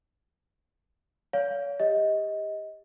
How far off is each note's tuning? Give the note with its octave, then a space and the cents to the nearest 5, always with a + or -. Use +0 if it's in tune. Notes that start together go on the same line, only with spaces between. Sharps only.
C#5 +45 F5 +0
G4 +25 D#5 +20